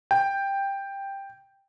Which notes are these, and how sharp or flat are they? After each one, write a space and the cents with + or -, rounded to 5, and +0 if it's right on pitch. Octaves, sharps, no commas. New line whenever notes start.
G5 +5